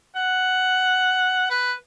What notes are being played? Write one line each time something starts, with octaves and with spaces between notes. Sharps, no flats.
F#5
B4